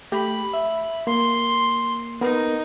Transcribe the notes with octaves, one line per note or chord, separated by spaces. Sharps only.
A3 G4 B5
E5
A#3 C6
B3 D#4 A#4